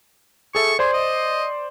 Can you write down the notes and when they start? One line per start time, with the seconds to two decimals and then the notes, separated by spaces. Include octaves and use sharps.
0.55 G#4 A4 E5 C#6
0.79 G#4 C5 D5 C6
0.93 D#5